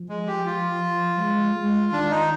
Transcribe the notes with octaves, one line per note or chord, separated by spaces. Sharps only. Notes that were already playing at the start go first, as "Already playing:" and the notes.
Already playing: F3
G#3
G4
F4
G#3
G#3
D#3 D4
D#4